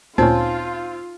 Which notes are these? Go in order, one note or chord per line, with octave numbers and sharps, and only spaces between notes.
D2 A#2 C4 C#4 D#4 F4